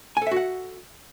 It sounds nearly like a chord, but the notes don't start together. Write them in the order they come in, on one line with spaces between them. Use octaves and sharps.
G#5 A4 E5 F#4 F#5